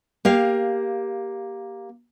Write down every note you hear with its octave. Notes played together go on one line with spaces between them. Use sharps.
A#3 G4 F5